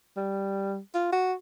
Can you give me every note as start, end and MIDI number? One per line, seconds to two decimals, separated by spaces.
0.17 0.78 55
0.95 1.09 65
1.12 1.34 66